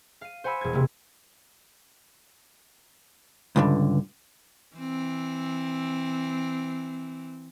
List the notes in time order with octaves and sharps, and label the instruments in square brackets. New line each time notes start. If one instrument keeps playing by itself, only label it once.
[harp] F5 D#7
C5 F#5 G#5 B5 E6
E1 G#6
C3 A#3
[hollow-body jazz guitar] C#2 G2 D3
[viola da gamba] E3 C4